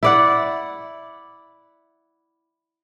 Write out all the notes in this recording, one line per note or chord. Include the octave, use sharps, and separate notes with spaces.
E4 D5 F#5